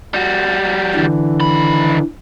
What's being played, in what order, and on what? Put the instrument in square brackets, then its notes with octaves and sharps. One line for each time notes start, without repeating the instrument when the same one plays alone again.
[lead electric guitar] G3 F#4
[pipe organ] D3 E3
[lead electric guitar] D#3 B5